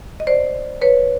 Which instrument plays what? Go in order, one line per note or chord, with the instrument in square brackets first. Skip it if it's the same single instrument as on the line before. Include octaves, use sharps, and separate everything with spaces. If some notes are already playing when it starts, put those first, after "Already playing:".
[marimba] D#5
C5 D5
B4 C#5